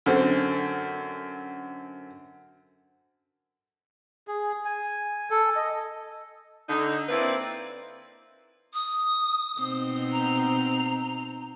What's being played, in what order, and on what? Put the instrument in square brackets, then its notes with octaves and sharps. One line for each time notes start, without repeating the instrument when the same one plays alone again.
[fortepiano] F#2 D3 C4
[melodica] G#4
G#5
A4
D#5
[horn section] D3 D#4
A#3 C4 E4 B4 D5
[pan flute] D#6
[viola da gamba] B2 C4 D#4
[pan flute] A#5